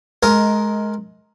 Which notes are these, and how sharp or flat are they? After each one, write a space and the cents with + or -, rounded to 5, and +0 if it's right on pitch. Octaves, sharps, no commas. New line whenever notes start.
G#3 +25 A#4 +0 D#5 +20